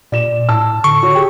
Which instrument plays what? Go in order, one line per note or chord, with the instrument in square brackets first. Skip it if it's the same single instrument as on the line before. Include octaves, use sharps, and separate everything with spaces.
[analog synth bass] A#2 [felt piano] D5 E7
[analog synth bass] A2 [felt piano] A5 E6
[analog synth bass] D3 [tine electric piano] C#6
[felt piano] F#4 C#5
G4 G#4 G5